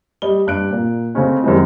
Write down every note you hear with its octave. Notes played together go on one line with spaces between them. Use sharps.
G3 D#5 G7
G2 F#6 D7
A#2
C#3 A3 C4 C#4 D#4
F#2 D#3 G3 G#3 C4 E4